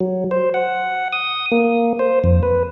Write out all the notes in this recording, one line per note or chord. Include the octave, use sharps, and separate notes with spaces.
F#3
C5
F#5
D#6
A#3
C5
F2
B4